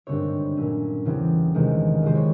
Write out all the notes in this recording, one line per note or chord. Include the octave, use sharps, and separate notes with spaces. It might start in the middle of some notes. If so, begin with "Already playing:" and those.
G#1 G2 D3 G3 C4 C#5
A#2 F#3 A3 C#4
E2 C#3 E3 G3 C4
E2 C3 D#3 G#3 C4
C2 C3 F3 G#3 C4 C5
C#5